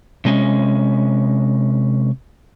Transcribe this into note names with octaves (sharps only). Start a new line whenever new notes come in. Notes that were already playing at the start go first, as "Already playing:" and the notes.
C3 G#3 C#4